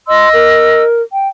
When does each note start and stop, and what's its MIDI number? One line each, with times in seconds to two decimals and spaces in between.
0.08 0.82 75
0.08 0.29 84
0.08 0.82 88
0.34 1.02 70
1.13 1.28 79